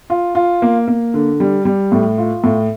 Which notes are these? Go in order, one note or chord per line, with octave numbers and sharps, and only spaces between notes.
F4
F4
A#3
A#3
D3
G3
G3
A2
F4
A2